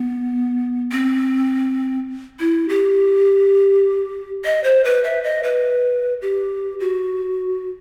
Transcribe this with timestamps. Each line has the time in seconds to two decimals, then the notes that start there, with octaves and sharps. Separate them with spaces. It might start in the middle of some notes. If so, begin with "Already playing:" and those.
Already playing: B3
0.92 C4
2.40 E4
2.69 G4
4.45 D#5
4.64 C5
4.85 B4
5.04 E5
5.23 D#5
5.43 B4
6.22 G4
6.80 F#4